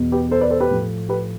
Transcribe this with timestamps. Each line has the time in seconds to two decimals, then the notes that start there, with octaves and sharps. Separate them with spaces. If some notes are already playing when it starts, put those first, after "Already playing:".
Already playing: E2 B2 B3
0.12 G4 B4
0.31 A4 C5
0.41 B4 D5
0.50 A4 C5
0.60 G4 B4
0.70 A2 F3 A3
1.09 G4 B4